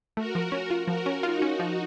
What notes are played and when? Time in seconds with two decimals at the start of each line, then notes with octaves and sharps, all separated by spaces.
0.16 A3 F#4 A#4
0.35 F3
0.52 C#4
0.70 F4
0.87 F3 F#4 A#4
1.06 C#4
1.23 D#4 F4 F#4
1.42 C#4
1.59 F3